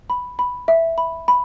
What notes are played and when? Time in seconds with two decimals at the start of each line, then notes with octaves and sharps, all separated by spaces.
0.10 B5
0.39 B5
0.68 E5
0.98 B5
1.28 B5